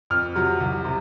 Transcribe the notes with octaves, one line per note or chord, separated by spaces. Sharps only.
F2 F6
C3 F#3
C2
C3